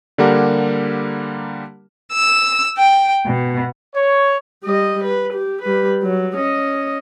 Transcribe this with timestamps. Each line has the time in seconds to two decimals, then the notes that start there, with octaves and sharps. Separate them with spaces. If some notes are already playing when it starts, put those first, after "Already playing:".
0.18 D3 G3 A#3 G4 A#4 F#5
2.12 E6
2.77 G5
3.25 B2
3.95 C#5
4.64 G3 D#5
5.04 B4
5.33 G4
5.62 G3 B4
6.02 F#3
6.36 C#4 D#5